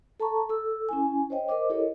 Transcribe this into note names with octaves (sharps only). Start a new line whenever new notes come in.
A4 A5 A#5 C#6
A4 E6
C#4 E4 G#5
C5 C#5 D#5 G5
A#4 C5 D#5 D6
E4 G4 A4 A#4 C#5 D#5